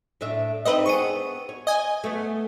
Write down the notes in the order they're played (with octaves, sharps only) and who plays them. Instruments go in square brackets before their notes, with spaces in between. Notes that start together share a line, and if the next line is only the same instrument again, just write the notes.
[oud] A2 D4 E5
[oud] C4 D4 D#4 [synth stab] B4 D#5
[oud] B3 D4 G#4 [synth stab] C#6 D#7
[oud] C#5
[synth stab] D#5 G#5
[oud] A3 B3